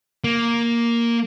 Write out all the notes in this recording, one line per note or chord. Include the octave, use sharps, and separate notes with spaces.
A#3